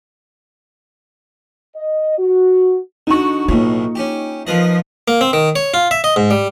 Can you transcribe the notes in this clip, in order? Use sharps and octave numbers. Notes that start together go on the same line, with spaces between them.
D#5
F#4
D3 D#4 F#4 C#6
B1 A2 A#3 F4
C#4 G4
F3 A#4 B4 D#5
A#3
C4
D#3
C#5
F4
E5
D#5
G#2
G3